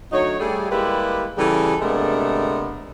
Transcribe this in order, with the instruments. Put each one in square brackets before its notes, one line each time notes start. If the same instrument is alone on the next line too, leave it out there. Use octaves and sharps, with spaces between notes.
[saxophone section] D2 F#3 D#4 C#5
G3 A3 G#4
G3 G#3 A#3 E4 G4 B4
C#3 E3 G3 A4
C3 G#3 A3 B3 D4 A#4